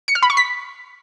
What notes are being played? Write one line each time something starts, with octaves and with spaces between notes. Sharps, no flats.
C#7
F6
B5
C#6
B6